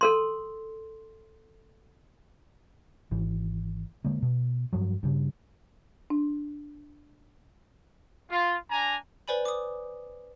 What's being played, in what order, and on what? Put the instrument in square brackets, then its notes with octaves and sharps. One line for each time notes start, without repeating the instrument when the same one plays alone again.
[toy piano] A4 A#4 C6
[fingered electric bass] G#1 E3
D3 G#3 A#3
B2
G2 F3 F#3
G2 C#3
[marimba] D4
[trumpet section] F4
D4 G#5 A#5
[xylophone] B4 C5 D5 G#5 B5
D6 D#6